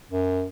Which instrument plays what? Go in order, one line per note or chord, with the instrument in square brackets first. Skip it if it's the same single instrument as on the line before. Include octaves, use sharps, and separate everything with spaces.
[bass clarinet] F#2